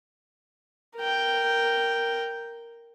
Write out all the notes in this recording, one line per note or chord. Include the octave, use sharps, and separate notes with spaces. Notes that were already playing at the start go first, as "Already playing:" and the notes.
A#4 G5